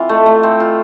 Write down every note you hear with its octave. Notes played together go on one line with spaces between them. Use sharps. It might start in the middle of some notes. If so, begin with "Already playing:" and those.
Already playing: E3 C4 F4
A3
A3
C4
F4